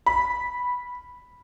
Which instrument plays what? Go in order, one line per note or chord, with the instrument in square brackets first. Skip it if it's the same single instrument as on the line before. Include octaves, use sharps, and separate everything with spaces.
[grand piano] B5